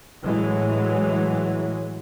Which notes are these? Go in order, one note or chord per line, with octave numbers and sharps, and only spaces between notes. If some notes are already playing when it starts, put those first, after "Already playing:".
A2 E3 F#3 G#3